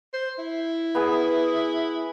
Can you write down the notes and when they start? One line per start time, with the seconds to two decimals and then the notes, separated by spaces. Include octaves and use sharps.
0.14 C5
0.39 E4
0.95 B3 G#4